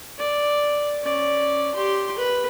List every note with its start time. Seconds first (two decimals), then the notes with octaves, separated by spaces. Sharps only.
0.18 D5
1.02 C#4 D5
1.75 G4 C6
2.18 B4